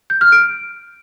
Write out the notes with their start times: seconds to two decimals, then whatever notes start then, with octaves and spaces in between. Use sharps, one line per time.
0.10 G6
0.21 F6
0.32 D7